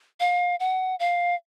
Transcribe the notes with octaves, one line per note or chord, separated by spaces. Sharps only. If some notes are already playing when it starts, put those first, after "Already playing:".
F5
F#5
F5